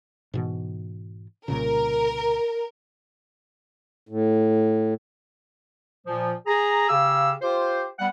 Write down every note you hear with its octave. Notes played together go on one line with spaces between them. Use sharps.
G#2 B2 E3
C2 A#2 C#3 A#4
A2
A#2 F3
G#4 A#5
C#3 G4 F5 E6
F4 G4 C5
G3 B3 F#5